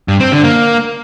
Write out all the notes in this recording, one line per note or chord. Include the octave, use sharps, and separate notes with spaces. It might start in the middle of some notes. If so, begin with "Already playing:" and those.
G2
C4
D3
A#3